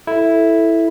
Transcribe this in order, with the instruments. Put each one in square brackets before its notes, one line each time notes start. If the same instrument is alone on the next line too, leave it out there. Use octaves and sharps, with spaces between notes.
[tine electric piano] E4 [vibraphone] A4